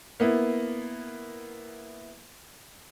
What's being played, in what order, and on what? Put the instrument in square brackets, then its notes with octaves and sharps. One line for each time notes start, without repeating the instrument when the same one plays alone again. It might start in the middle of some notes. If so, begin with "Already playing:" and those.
[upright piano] A#3 B3 E4